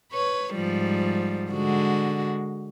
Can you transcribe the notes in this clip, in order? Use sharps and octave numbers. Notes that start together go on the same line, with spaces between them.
B4 C#5
G#2 F3 G3
D3 G#3 F#4